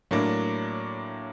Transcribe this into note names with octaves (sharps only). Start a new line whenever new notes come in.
A2 F#3 A#3 D4